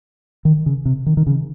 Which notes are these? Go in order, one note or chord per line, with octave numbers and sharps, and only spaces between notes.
D#3
C#3
C3
D#3
D#3
C#3